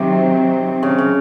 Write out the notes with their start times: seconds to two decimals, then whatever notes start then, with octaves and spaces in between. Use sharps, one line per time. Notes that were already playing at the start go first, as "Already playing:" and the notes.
Already playing: C3 D#3 F#3 C4
0.83 C#3
0.98 C#3